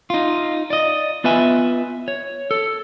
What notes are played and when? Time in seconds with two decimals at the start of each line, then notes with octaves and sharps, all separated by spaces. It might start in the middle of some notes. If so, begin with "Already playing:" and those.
0.10 D#4 F4
0.70 D5 D#5
1.24 B3 F4 B4 D#5 E5 G#5
2.08 C#5
2.51 A4